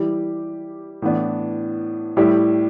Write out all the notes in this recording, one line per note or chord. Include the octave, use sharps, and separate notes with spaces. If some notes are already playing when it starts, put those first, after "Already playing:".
Already playing: E3 G3 E4 G4
A2 E3 B3 D4
A2 G3 E4 G4